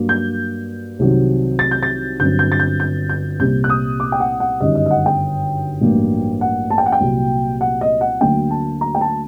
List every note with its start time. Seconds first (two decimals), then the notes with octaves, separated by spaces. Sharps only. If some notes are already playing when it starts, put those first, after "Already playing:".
Already playing: G2 F#3 A#3
0.09 G6
0.99 C2 C3 D#3 F#3 C4
1.59 A6
1.71 G6
1.83 A6
2.19 G1 G2 F#3 C4 G6
2.39 G6
2.52 A6
2.60 G6
2.80 G6
3.09 G6
3.39 C2 A#2 G3 C4 G6
3.64 F#6
3.70 D#6
4.00 D6
4.12 G5
4.20 F#5
4.40 F#5
4.60 G1 F#2 D#3 G3 D#5
4.75 D#5
4.86 D#5
4.91 F#5
5.06 G5
5.81 A1 G2 F#3 A#3
6.41 F#5
6.70 A5
6.78 G5
6.86 F#5
6.92 G5
7.01 C2 A#2 F#3
7.61 F#5
7.81 D#5
8.01 F#5
8.21 D2 D3 F#3 A#3 G5
8.51 A5
8.81 A#5
8.95 G5
9.01 A5